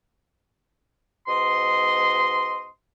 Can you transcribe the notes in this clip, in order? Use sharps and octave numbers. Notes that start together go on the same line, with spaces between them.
G#2 B2 D#5 C6